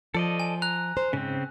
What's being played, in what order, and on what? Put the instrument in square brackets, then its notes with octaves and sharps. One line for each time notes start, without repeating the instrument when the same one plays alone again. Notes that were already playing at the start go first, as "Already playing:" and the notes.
[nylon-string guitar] F3 [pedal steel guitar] A4 D5 D#5
[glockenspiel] G#5
[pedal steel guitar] A#5 [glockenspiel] F#6
[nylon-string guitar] C5
[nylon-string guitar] G#2 [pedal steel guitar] C#3 C4